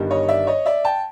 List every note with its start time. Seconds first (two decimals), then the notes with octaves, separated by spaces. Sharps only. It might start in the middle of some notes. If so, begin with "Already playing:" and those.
Already playing: G1 G2 D#3 G3
0.11 C#5 D#5
0.28 D5 E5
0.47 C#5 D#5
0.66 D5 E5
0.85 G5 A5